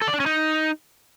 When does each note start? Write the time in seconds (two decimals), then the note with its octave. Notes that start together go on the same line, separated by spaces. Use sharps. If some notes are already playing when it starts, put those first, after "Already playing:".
0.02 A4
0.08 D5
0.14 D4
0.20 C#4
0.26 D#4